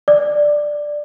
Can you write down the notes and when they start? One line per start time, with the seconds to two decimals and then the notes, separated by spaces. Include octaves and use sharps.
0.08 D5